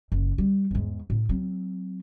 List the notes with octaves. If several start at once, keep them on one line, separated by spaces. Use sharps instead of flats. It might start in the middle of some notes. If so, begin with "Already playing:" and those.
F#1
G3
E2 G#2
A2
F#3 C4